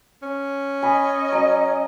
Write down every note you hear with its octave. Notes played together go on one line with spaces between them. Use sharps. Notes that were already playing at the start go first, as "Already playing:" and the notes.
C#4
D#5 G#5 B5
F#3 A#5